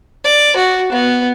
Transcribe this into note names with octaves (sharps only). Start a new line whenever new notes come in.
D5
F#4
B3